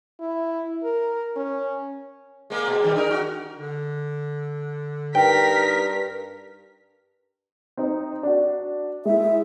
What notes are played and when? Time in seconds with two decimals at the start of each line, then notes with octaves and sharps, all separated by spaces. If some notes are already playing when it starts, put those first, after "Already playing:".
0.20 E4
0.84 A#4
1.36 C#4
2.50 G#3 A#3
2.67 B2
2.82 G#2 D#3 G3
2.96 D4 D#4 A#4
3.11 F#4
3.58 D3
5.15 G2 D#4 A#4 G5 B6
7.77 C4 D#4
8.23 D4 F#4
9.05 G#3 E4 E5